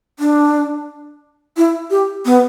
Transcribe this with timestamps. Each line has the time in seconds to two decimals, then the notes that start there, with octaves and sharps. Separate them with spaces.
0.19 D4
1.57 E4
1.91 G4
2.25 B3